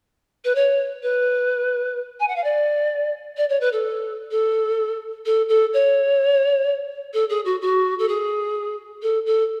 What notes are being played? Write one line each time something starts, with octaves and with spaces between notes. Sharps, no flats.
B4
C#5
B4
G#5
F#5
F5
D5
D5
C#5
B4
A4
A4
A4
A4
C#5
A4
G#4
F#4
F#4
A4
G#4
A4
A4